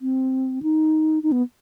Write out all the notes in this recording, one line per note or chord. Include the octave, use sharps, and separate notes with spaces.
C4
D#4
D#4
B3